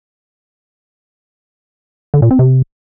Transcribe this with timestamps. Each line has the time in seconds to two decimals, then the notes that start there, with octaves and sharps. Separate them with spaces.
2.14 D3
2.22 A#2
2.31 C4
2.39 C3